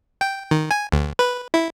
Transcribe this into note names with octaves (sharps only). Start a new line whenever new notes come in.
G5
D#3
G#5
D2
B4
E4